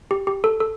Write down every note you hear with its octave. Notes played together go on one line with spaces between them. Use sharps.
G4
G4
A4
A4